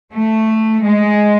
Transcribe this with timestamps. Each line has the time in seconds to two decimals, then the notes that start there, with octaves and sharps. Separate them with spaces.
0.13 A3
0.83 G#3